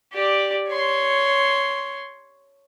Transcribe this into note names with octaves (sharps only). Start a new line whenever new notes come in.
G4 D5
C#5 C6